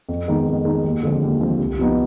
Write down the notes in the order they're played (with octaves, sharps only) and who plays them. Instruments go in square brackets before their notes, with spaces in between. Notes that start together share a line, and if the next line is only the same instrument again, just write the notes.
[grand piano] F2
D#3 G#3 B3 D#4
F2
D#3 G#3 B3 D#4
D#2
D3 F3 G#3 C4
D#2
D3 F3 G#3 C4
C2
C3 F3 B3 D#4